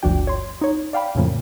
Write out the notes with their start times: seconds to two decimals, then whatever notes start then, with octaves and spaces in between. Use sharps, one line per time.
0.03 G1 D2 F3 D4 F#4 G5
0.27 C#5 C6
0.61 D#4 C#5
0.93 D5 F5 G5 B5
1.15 F2 A2 C#3 F3 A#3